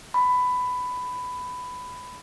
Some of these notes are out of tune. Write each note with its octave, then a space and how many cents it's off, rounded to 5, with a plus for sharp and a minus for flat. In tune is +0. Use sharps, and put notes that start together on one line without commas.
B5 +15